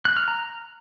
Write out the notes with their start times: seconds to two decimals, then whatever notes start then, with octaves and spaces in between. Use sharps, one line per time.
0.05 F#6
0.17 F6
0.28 A#5